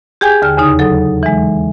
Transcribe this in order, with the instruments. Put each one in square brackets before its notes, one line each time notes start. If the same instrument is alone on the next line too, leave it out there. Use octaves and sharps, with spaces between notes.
[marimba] G4 G#4 G5 G#5 G6 G#6
D#2 D3 F6
E2 C#3 D#4 D#6
F#3 A4
E3 G#3